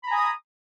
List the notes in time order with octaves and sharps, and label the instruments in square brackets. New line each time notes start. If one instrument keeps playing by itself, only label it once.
[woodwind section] B5
A#5
G#5
D#6